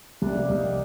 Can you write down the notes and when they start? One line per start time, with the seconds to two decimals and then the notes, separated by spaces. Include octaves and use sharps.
0.22 C2 D4
0.36 C2 A#3
0.50 C2 D#4
0.64 G4